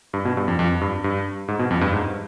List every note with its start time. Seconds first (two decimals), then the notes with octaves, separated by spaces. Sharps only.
0.14 G2
0.25 B2
0.37 G2
0.48 F2
0.59 F2
0.81 G2
1.04 G2
1.48 G#2
1.59 B2
1.71 F2
1.81 G2
1.93 G#2